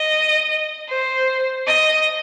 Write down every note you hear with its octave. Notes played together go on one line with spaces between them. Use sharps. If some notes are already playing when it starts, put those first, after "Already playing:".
Already playing: D#5
C5
D#5